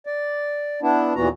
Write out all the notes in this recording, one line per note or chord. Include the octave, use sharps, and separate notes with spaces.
D5
B3 D4 E4
D#2 A#2 E3 B3 F#4 A#5